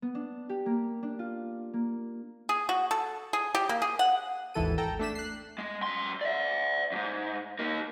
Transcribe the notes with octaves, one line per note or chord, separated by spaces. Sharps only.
B3
D4
G4
A#3
D4
F4
A#3
G#4
F#4
A4
G#4
G4
A#3
G#4
F#5
G#1 D#2 E3 A4 D#7
A4 G5 A#5
A3 D4 B6 E7
F#6 C7
G#3
F#2 C6
D5 E5
F2 G#2
A#3 D#4